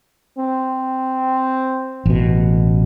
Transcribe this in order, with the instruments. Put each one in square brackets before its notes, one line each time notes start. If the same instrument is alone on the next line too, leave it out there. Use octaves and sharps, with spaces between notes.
[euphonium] C4
[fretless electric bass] A1 B2